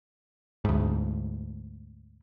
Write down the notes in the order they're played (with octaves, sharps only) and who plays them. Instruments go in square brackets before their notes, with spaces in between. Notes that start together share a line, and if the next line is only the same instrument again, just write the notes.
[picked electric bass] D2 G#2